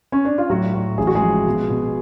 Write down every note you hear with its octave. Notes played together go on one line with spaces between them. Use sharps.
C#4
D4
F4
A2 F#3 F#4
A2
A1 G#4
F#4
G#3 G#4
F3
B2
B2